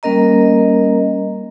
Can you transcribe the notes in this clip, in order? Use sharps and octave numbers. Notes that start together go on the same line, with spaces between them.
G3 A#3 C#4 A#4 D#5 A#5